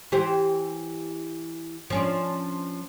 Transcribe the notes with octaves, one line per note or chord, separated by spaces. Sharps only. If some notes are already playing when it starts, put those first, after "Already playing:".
E3 G4 C5
F3 C#4 D4